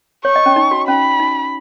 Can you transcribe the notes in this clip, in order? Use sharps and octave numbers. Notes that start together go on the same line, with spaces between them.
C#5 C#6
D#5
C#4
D#4
F#4
C#4 B5
D#4